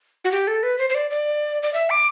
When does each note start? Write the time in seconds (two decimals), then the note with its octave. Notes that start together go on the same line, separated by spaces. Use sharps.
0.25 F#4
0.32 G4
0.47 A4
0.63 B4
0.79 C5
0.90 C5
0.95 D5
1.11 D5
1.63 D5
1.74 E5
1.90 D6